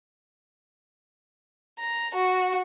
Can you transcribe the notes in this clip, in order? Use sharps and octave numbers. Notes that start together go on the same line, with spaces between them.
A#5
F#4